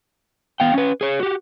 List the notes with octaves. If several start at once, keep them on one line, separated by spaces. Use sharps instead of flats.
B3 F5 G5
C#4 B4
G#4 C#5
F#4 G4